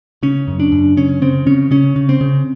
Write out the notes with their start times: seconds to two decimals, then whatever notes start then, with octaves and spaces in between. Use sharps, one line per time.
0.23 C#3 C#4
0.48 F#2
0.60 D4
0.72 F#2
0.97 C#3 C#4
1.22 C#3 C4
1.46 C#3 C#4
1.71 C#3 C#4
1.96 C#3
2.09 C4
2.21 C#3